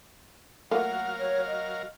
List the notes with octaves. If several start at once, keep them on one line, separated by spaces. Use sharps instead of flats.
F#3 A3 A#3 F4 A#4 F5 F#5
C#5
D#5